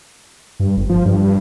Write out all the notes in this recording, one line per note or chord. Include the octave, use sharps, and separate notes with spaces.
G2
G1
F3
G2
G2